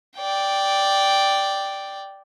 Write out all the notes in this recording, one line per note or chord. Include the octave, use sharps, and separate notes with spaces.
D5 G5